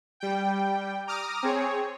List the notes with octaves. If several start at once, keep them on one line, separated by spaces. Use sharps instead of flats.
G3 G5
A#5 D6 D#6 F6
C4 G#4 C#5